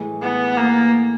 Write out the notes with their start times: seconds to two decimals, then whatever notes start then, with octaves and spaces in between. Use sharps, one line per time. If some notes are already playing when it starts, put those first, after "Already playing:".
Already playing: A2 E3 G#3
0.22 B3
0.57 A#3